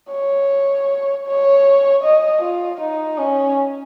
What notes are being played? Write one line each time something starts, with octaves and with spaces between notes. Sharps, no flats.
C#5
C#5
D#5
F4
D#4
C#4